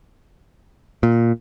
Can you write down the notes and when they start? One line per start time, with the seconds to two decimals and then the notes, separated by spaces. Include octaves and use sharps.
1.03 A#2